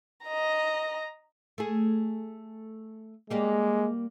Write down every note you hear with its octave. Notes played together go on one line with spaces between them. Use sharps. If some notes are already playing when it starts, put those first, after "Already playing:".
D#5 A#5
A3 G#4
G3 G#3 A#3 G4